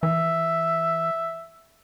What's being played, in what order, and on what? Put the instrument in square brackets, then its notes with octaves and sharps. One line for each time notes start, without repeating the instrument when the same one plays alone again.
[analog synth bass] E3 [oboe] E5